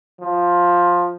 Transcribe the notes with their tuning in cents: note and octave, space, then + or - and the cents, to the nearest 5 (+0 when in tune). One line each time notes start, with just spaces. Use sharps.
F3 +10